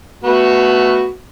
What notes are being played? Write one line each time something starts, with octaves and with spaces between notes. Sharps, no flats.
A3 B3 F#4